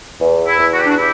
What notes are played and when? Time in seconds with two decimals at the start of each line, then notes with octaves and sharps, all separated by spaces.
0.21 E2
0.47 E4
0.59 E2
0.72 F#4
0.79 G4
0.86 D4 F#4
0.97 E4 G4